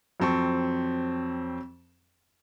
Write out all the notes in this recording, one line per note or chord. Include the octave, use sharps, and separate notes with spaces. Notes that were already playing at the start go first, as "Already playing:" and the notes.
F2 F#3 C4 A5 C#6